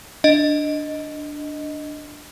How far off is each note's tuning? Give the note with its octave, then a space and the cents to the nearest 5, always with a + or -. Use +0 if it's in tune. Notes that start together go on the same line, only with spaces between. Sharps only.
D4 +0 D#5 +0